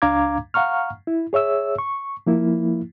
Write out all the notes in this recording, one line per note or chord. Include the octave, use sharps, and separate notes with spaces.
C#2 D4 F5 A#5 D6 G#6
F5 F#5 A#5 C#6 F6
E4
G#4 C#5 E5 E6
C#6
F3 A#3 E4